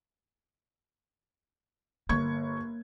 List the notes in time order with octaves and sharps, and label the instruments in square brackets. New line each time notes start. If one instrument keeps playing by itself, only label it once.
[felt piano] G1 C#6 G#6 [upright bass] A#3